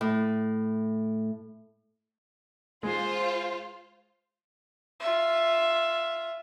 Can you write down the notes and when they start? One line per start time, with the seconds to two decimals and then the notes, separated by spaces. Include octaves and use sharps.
0.01 A2
2.83 G#3 F4 C5
5.00 F4 E5